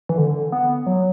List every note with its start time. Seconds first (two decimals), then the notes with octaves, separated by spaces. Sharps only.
0.09 E3
0.18 D3
0.52 B3
0.86 F#3